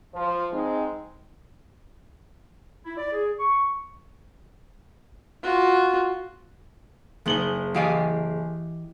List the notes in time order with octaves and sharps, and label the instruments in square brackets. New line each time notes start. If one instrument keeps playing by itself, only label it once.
[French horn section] F3
G#3 C4 D#4
[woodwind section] E4
D5
G#4
C#6
[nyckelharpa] F4 F#4
[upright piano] F#1 F#7 G7 [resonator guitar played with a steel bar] G#3 B3 D#4
[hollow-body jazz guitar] E3 G4 D#5 [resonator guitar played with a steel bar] G#4 F5 G#5